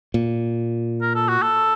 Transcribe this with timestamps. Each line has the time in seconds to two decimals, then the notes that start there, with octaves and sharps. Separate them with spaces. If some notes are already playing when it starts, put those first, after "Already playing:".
0.14 A#2
1.02 A#4
1.16 A4
1.29 F#4
1.42 A4